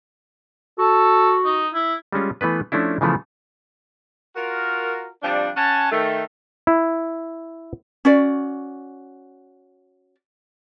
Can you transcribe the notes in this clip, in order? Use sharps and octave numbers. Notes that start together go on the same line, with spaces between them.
F#4 A4
D#4
E4
G3 G#3 C#4 F4
E3 A3 B3 B4
F3 A3 C#4 D4 E4
C#3 E3 F3 A3 B3
F4 F#4 A#4
C3 F3 G3 D4
C#4 F#5 G#5 A5
D#3 A3
E4
C#4 F#4 D5